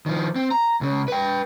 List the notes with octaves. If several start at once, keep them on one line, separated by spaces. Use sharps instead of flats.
D#3 F3
C4
A#5
C#2 C#3
B4 G5